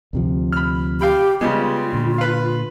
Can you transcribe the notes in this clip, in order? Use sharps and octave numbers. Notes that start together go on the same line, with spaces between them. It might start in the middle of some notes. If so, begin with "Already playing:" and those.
D2 C3 F3
B5 F6
G4 F5 G5 B5
C#3 G3 G#3 B3 F4
A#2 D3
B4 F5